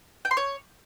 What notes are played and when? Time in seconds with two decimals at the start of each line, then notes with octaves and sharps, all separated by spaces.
0.25 G5
0.31 C6
0.37 C#5